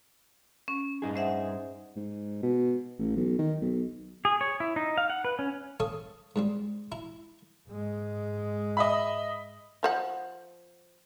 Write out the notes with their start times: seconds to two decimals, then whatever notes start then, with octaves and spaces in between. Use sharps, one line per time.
0.68 C#4
1.02 G2 D#4 G#4
1.16 C5 E5 F#5
1.96 G#2
2.43 B2
2.99 A1
3.16 B1
3.38 D#3
3.61 B1
4.25 G#4
4.41 C#5
4.60 E4
4.76 D#4
4.98 F5
5.10 F#5
5.25 B4
5.39 C#4
5.80 A4 C#5 F5 C#6 D#6
6.36 G#2 G3 C4
6.92 E4 A#5
7.69 G#2 G#3
8.77 D#5 E5 B5
9.83 F3 C5 F#5